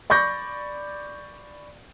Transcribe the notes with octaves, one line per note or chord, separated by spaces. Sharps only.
D5 B5 C#6 G6 A#6